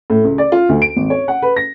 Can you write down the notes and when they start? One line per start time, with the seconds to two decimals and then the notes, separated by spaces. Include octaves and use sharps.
0.10 A2
0.25 C#2
0.38 D5
0.52 F4
0.69 D2
0.82 D7
0.96 G#1
1.10 C#5
1.28 F#5
1.42 B4
1.56 A#6